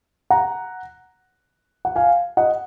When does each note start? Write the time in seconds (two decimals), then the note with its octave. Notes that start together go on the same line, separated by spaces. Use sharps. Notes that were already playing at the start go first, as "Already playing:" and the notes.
0.30 F#5 A#5
1.85 F#5
1.96 F5 G#5
2.37 D#5 F#5